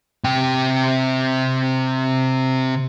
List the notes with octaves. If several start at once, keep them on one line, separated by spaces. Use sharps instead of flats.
C3 G5